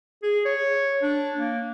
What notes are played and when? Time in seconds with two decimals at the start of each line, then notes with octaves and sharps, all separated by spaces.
0.23 G#4
0.45 C#5
1.02 D4
1.35 A#3